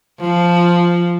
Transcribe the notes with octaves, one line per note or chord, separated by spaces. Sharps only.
F3